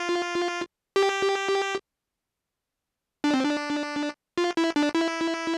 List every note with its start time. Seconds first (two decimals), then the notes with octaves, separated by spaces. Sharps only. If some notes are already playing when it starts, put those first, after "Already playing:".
Already playing: F4
0.96 G4
3.24 D4
3.34 C4
3.44 D4
4.38 F4
4.57 E4
4.76 D4
4.95 E4